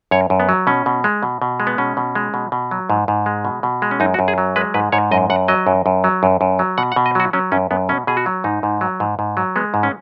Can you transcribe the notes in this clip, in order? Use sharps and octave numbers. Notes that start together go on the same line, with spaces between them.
F#2 C#5
F#2
B3
F#3
B2 C#4
B2
G#3
B2
B2
G#3
B3
B2 C#4
B2
G#3
B2
B2
F#3
G#2
G#2
G#3
B2
B2
G#3
C#4
F#2 D#4
F#4
F#2
G#4
F#3
G#3 B4
G#2 B4
G#2 C#5
F#2 D#5
F#2 F#5
F#3 D#5
F#2
F#2
F#3
F#2
F#2
F#3
B2 F#5
F#5
B2
D#5
F#3 F#4
F#3 C#4
F#2 C#4
F#2 B3
B2 C#4
B2 G#4
F#4
F#3
G#2 D#4
G#2
F#3
G#2
G#2
F#3
G#3 B3
G#2
C#4